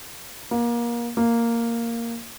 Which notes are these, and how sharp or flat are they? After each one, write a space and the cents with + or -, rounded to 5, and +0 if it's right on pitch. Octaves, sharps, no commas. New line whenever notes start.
A#3 +25
A#3 -5